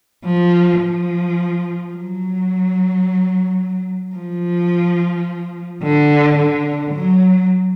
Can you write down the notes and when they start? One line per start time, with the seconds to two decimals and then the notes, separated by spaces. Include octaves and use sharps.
0.25 F3
0.80 F3
1.93 F#3
4.15 F3
5.82 D3
6.38 D3
6.94 F#3